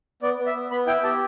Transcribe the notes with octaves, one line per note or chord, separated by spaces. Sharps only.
B3 D5
B3
E5
B3
B3 B5
E4 G5
G4 A5